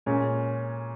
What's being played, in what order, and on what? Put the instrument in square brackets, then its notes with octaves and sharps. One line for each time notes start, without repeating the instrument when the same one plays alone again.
[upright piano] A#2 G#3 C#4